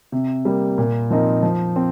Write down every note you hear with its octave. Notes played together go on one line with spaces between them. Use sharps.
C3
G3 A#3
A#2
F3 C4 D#4 A#4
F3
C4